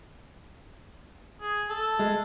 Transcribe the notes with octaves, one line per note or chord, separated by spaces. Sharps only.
G#4
A4
G#3